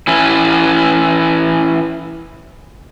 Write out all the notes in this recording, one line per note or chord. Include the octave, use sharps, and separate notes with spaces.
E3 C#4 E4